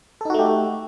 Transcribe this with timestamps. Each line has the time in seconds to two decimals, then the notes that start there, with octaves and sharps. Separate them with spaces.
0.21 A4
0.25 D#4
0.30 F#4
0.34 A3
0.39 G4